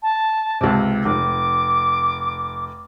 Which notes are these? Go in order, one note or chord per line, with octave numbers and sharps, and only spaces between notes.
A5
C#2 C3
F1 D6